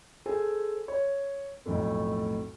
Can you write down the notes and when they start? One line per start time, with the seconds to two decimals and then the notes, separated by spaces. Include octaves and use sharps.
0.26 G#4 A4 C5 G#5
0.88 C#5
1.65 B1 F2 A2 A3